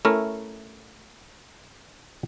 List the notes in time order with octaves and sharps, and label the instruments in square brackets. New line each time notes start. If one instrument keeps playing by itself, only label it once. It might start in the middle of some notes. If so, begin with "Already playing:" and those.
[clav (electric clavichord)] A3 C#4 E4 A#4